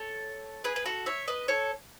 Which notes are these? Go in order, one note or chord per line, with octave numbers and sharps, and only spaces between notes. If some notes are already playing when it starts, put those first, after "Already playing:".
Already playing: A4 C#5
G#4 B4
B4
F#4 A4
C#5 E5
B4 D#5
A4 C#5